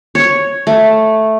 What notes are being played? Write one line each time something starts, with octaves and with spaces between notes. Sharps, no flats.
C#5
A3